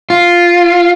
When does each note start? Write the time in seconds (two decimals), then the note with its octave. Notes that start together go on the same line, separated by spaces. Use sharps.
0.10 F4